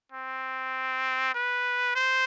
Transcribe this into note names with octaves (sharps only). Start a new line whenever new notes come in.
C4
B4
C5